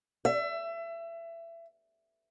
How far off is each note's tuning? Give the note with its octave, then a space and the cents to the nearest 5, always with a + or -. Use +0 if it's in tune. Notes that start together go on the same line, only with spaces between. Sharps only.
E5 +25